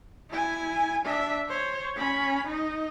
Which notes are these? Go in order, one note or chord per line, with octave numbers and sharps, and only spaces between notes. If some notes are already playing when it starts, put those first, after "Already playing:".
E4 G#5
D4 E5
C5 C#5
C#4 B5
D#4 D#5